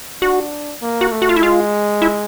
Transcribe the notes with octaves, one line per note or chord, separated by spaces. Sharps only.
D4 F#4
A#3
F#4
A3
F#4
F4
E4
G#3 F4
E4